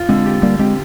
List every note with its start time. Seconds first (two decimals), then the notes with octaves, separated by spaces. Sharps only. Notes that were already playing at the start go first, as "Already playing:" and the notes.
Already playing: F4
0.09 D3 G#3 C4
0.26 G4
0.42 D3 G3 A#3
0.59 G#3 C4 G4